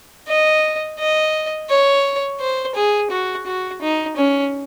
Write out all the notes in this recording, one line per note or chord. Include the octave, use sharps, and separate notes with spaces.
D#5
D#5
C#5
C5
G#4
F#4
F#4
D#4
C#4